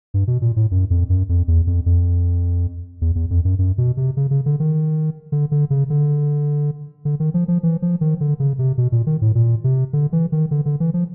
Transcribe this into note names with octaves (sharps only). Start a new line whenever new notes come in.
G2
B2
A#2
A2
F#2
F2
F#2
F2
E2
F2
F2
E2
E2
F2
F#2
F#2
B2
C3
C#3
C#3
D3
D#3
D3
D3
C#3
D3
D3
D#3
F3
F3
E3
F3
D#3
D3
C#3
C3
B2
A#2
D#3
A2
A#2
C3
D3
E3
D#3
D3
D3
E3
F3